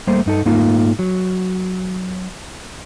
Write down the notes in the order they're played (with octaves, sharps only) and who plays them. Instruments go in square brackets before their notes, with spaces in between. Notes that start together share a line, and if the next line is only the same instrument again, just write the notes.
[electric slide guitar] G3 A3 A#3 C5
G2 D#4 A4
G#2 A3 A#3 D#4 F4
F#3